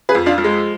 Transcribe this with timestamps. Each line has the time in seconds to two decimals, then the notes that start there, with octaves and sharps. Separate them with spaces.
0.09 G#4 B4
0.15 F2
0.26 D4 F4
0.38 F3
0.44 G#3